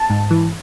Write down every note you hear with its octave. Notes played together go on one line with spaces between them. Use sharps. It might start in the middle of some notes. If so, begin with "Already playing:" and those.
Already playing: A5
G#2
E3